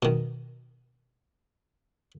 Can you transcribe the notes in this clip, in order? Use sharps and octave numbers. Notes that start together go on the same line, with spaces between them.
B2 D#3